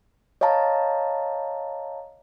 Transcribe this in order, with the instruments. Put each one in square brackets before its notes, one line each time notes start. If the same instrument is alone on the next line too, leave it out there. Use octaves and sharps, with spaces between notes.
[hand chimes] C#5 D#5 F5 A5 A#5